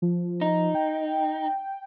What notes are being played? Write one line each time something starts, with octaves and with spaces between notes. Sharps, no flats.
F3
D#4
G5